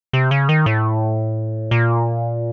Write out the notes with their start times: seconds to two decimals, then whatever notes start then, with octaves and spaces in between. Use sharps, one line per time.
0.13 C3
0.31 C#3
0.49 D#3
0.66 A2
1.71 A#2